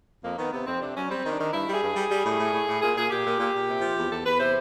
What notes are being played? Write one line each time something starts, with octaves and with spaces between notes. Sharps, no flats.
F2 A#3
D#3 B3
C3 B3
F2 C4
C3 D4
F#3 C#4
G3 C4
D#3
D4
D#3
G2 E4
G3
G#4
G2
G3
G3
A2
A2
A2
A2
A#2 G#4
A#2 G#4
A#2 G4
A#2
A#2
A#2
C3
F3
E2
E2 A4
E2 B4
C3 C5